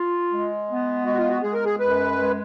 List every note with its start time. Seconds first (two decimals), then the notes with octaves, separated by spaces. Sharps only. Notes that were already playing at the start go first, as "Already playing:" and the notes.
Already playing: F4
0.30 G#3
0.68 B3
1.05 G#3 F#4
1.17 F4
1.29 F#4
1.43 G#3 G#4
1.53 A#4
1.65 G#4
1.80 F#2 B4
2.17 G#3